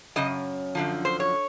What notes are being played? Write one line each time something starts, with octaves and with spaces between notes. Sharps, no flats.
F#2 C#3 D#5
F#2 D3 F3
C5
C#5